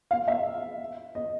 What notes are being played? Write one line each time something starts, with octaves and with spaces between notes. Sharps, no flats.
F5
E5
D#5